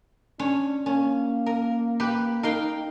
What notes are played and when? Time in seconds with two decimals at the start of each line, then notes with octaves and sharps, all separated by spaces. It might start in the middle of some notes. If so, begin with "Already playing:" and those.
0.39 C#4 D4 C#5
0.86 A#3 C#4
1.46 A#4
2.00 G4 B4
2.43 D#4 A#4 F5 G5